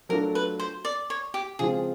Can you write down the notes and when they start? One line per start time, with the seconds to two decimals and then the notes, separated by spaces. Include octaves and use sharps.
0.09 F#3 A3 D4 F4 A4 A#4
0.35 B4
0.59 C5
0.85 D5
1.10 C#5
1.34 G4
1.59 C#3 F3 G#3 C4 F4 G#4